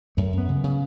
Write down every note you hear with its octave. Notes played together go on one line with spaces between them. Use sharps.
F#2 A3
F#2 B3
C#3
C#3